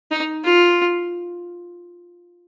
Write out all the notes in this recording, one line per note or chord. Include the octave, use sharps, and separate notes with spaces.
D#4
F4